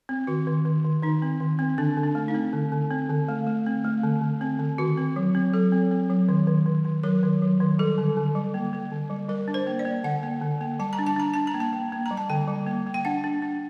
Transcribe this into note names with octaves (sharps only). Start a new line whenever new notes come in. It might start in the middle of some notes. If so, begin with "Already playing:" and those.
C4
D#3 F#4
D#3
D#3
D#3
D#3 D#4
C4
D#3
C4
D3 D4
D3
D4
A3
D#4
C4
D3
D3
C4
D3
A3
A3
C4
A3
D3
D3
C4
D3
D#3 F#4
C4
F#3
C4
F#3 A4
C4
C4
F#3
D#3
D#3
D#3
D#3
F#3 A#4
D#3
F#3
D#3
G3 A4
D3
D3
G3
A#3
A#3
D3
G3
G3 A#4
D4
C5
A#3
D5
A#3
D3 F#5
A#3
D3
A#3
G3 A5
A#5
D4
A5
D4 A#5
D4 A5
A#5
A#3
A5
A#3
A#3
A#5
G3
A5
D3 G5
G3
A#3
A#3
G5
D4 F#5
D4
D4